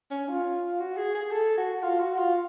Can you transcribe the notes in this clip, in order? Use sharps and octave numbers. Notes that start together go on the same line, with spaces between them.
C#4
F4
F#4
G#4
G#4
A4
F#4
F4
F#4
F4